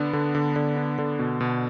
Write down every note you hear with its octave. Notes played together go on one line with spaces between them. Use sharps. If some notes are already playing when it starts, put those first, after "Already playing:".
Already playing: D3 B3 D4
D3
D3
D3
D4
D3
B2
B2